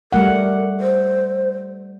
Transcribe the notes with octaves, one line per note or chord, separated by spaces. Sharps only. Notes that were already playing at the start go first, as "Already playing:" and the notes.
G3 A3 A#4 F#5
C5